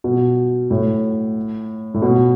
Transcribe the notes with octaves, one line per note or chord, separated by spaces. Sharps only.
B2
A2
A2
B2